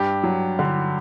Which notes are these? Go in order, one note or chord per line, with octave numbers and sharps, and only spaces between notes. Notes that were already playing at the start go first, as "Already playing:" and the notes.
Already playing: G2 G4
F#3
D3